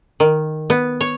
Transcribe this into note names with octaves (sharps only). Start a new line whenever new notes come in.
D#3
B3
C#5